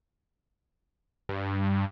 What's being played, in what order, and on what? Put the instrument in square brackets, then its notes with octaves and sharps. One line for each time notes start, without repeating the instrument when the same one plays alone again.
[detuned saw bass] G2